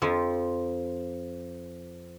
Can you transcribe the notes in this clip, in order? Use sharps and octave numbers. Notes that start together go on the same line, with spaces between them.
F2 F3